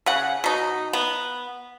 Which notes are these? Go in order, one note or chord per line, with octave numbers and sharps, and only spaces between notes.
C#3 F#5
B2 D#4
B3